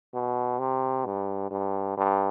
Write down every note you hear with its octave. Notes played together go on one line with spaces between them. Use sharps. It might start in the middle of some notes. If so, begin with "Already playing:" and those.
B2
C3
G2
G2
G2